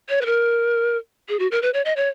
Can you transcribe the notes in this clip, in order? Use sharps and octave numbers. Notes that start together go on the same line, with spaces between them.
C#5
B4
A#4
G#4
F#4
A#4
B4
C#5
D#5
C#5